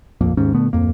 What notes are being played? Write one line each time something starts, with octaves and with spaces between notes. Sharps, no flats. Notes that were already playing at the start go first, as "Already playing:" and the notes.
D1 A#1 F2 A#3
G#1 D#2 G#2 C#4
A#2 D3 A3 B3
D1 G#1 F2 A#3